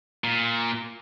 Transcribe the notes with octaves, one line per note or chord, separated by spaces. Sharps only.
A#2